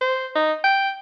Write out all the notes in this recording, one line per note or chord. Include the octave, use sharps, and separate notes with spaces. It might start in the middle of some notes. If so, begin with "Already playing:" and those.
C5
D#4
G5